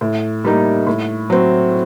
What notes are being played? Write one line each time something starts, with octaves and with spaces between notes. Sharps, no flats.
A2
G3 A#3 D#4
A2
F#3 C4